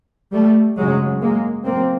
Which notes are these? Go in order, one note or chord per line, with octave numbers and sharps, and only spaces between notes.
G3 A3
G#1 F#2 C#3 F#3 G#3
G#3 A#3
F#1 F#2 A#3 C4